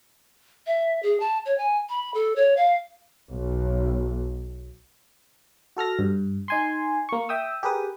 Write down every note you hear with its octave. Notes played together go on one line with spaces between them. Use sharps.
E5
G#4
A5
C#5
G#5
B5
A4
C#5
F5
B1
F#4 A4 F6 A#6
G2
D#4 G#5 C6
A#3 C#6
E5 G5 D#6 E6
G4 G#4 A#4 B4 D#6